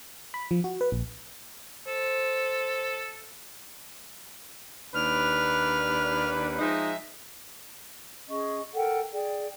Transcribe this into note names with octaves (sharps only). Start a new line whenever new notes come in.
B5
F3
F#4
B4
A#1
A4 C5
D#2 D4 B4 F6
F3 G#3 D#4 E5
C#4 G#4 D#5 C#6
A4 A#4 F#5 G5
G#4 D5 G5